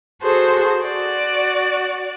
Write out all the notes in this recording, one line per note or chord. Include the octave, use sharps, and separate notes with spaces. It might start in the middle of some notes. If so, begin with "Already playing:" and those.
F#4 G#4 A4 C5
F#4 D5